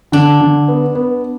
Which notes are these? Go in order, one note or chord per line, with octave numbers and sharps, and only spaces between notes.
D3 D4
D3
B3
B3